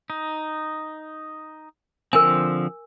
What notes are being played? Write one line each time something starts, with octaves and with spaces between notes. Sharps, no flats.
D#4
D3 F3 C4 A#4 G#5